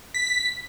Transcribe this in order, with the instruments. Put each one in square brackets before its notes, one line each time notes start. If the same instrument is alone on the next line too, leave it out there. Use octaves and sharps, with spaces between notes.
[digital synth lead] B6